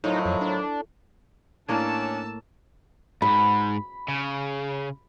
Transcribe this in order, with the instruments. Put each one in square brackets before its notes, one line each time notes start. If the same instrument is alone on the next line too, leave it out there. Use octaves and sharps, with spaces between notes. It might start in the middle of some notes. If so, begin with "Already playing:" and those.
[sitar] A2 [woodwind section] D#3 F3 F#3 [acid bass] D#4
[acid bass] F2
D4
[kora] A2 A#3 C#5 [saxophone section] C#4 D4 [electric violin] A5 E6
[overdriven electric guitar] G#2 [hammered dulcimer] B5
[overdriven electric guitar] C#3